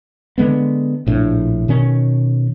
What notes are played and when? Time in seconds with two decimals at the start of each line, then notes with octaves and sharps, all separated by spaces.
0.38 D3 G#3 B3
1.07 A#1 A2 D4
1.68 B2 D#3 C#4